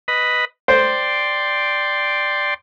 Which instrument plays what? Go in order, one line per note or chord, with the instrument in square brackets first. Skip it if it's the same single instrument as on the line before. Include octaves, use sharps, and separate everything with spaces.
[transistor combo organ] B4 D#5 B5
[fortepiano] C5 [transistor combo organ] D5 G5 C6